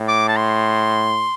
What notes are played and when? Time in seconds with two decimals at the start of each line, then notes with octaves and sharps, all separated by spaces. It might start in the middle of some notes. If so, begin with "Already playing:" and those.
Already playing: A2
0.08 D6
0.29 A5
0.37 C6